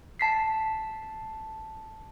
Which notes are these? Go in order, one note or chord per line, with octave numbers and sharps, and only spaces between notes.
A5 B6 C7